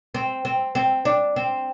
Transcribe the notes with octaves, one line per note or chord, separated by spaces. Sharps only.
C4
C4
C4
D4
C4